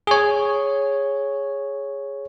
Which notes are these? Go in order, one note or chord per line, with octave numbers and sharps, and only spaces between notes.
G#4 C#5